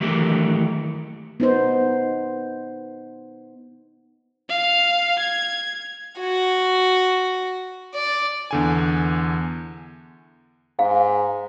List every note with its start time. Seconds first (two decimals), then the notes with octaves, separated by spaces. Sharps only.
0.01 D#3 E3 F#3 A3 G4 A#4
1.40 B3 D#4 C5
4.49 F5
5.18 G#6
6.20 F#4
7.95 D5
8.51 E2 D3 G#5
10.79 G#2 F5